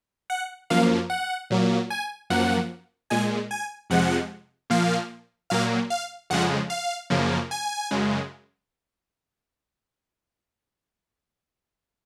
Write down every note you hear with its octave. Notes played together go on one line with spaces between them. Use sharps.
F#5
F#2 F3 A#3 F5
F#5
A#2 F#3 A#3
G#5
F#2 F3 A#3 F#5
A#2 G#3 G#5
G#5
F2 C3 F3 G#3 F#5
A#2 F3 A#3 F5
A#2 F#3 A#3 F5
F5
F2 C#3 F3 G#3 F#5
F5
F#2 C#3 F3 A#3
G#5
F#2 C#3 G#3